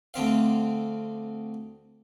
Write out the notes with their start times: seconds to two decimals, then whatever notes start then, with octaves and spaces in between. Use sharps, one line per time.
0.14 D2 D3 C4 F5